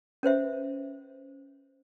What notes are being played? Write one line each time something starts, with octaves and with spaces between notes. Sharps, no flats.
C#4 B4 C5 E5